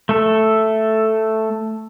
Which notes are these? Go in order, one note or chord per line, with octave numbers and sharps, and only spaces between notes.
A3 A4